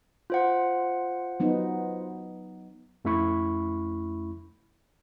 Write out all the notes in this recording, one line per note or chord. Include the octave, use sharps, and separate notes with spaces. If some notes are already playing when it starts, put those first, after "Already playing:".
F4 C5 F#5
F#3 B3 D#4
F2 A3 C#4 E4 B5 C#6